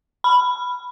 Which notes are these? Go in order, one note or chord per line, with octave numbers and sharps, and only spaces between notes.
B5